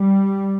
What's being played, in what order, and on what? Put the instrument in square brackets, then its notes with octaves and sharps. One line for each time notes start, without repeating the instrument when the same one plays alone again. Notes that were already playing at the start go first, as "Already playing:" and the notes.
Already playing: [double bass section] G3